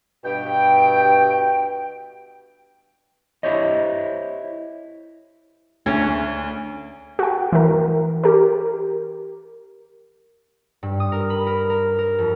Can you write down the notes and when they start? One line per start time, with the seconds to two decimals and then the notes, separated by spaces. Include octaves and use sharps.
0.24 G2 B2 G5
3.43 E4 G4 C5 C#5 D#5
5.86 D2 C#4 C#5
7.19 F#4 G5
7.52 E3 A#4
8.24 G4 A#4
10.83 G2
11.00 D#6
11.12 A#4
11.30 B5
11.47 A#4
11.70 A#4
11.99 A#4
12.19 F2